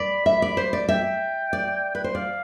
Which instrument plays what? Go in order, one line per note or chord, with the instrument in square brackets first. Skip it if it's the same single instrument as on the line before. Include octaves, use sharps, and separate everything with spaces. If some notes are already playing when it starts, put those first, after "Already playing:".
Already playing: [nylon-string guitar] D5 [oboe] B5
[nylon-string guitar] E5
D5
C5
D5
[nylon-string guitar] E5 [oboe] G5
[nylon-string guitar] D5
B4
C5
[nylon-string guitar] D5 [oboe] F5